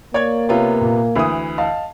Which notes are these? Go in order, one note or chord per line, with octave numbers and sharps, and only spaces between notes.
A#3 C#5 D5 G#6
C3 B3 F4 C#5
A#2
D2 E3 B5 D#6
D#5 F5 A5